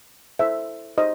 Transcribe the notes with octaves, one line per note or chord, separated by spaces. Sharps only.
E4 A4 C5 E5
D#4 G4 C5 D#5